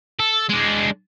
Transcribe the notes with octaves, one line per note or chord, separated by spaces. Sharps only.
A4
G#3 D4